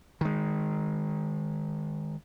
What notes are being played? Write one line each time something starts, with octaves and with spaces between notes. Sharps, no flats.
D#3 G#3